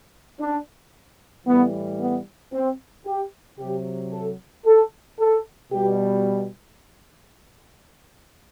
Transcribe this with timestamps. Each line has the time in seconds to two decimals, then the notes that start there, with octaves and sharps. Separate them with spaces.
0.40 D4
1.47 A2 E3 G3 B3
2.00 B3
2.53 C4
3.06 G4
3.59 C3 F#3 G4
4.13 A4
4.65 A4
5.19 A4
5.72 B2 G3 G4